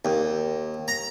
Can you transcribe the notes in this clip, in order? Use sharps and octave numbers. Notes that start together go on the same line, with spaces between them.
D#2
A#5